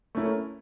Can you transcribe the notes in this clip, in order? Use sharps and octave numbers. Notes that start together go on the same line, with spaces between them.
A3 C#4 E4 A#4